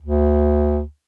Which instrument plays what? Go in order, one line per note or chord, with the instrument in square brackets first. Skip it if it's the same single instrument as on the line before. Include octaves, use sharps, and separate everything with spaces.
[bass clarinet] D2